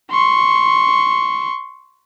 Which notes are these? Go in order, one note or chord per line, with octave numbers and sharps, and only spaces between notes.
C6 C#6